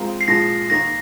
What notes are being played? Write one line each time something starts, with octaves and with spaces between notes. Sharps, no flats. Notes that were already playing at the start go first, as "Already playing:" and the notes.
Already playing: G#3 C4 F4 A#4
C7
A#2 F3 G#3 A#6
D#3 A#3 D#4 A#6